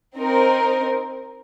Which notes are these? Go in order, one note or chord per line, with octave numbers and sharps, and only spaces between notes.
C4 D#4 A#4